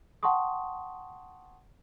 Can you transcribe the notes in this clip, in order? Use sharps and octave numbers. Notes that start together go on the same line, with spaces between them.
F#5 G5 A5 C6 C#6 D#6